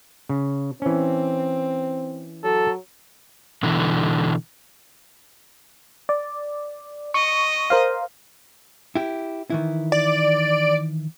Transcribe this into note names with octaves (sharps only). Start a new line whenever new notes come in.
C#3
E3 C4 C#4
F#3 A4
B2 D3 E3
D5
D#5 C#6
A#4 C5 F5
E4 G4
D#3 E3 E4
D5